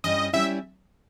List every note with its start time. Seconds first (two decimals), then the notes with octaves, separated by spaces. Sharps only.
0.04 G2 G3 C#4 E4 D#5
0.33 G3 C#4 E4 E5